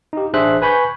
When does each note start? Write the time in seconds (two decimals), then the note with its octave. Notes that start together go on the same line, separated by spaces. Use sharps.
0.13 D#4 G4
0.34 A1 D4 G#4 C5 E5 F#6
0.62 B4 G#5 B5 C#6 G6